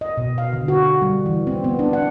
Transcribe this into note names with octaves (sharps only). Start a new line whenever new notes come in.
D#5
B2
F5
D3
F#4
G3
E3
C4
B3
D4
F#5